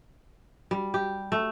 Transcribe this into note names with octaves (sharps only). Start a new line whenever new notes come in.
G3
G4
A3